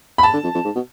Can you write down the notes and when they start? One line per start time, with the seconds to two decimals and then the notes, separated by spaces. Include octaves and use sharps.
0.18 B5
0.23 A5
0.34 D3
0.44 F2
0.55 F2
0.65 G#2
0.76 B2